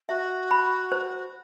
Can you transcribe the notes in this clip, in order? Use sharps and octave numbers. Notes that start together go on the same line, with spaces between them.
F#4 E5
B5
C5